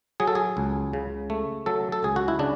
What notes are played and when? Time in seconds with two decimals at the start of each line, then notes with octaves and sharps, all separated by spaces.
0.20 F#3 G#4
0.28 A4
0.35 G#4
0.57 C#2
0.93 C#3
1.30 A3
1.66 F#3 A4
1.92 A4
2.03 C#2 G#4
2.16 F#4
2.28 E4
2.39 C#3 D4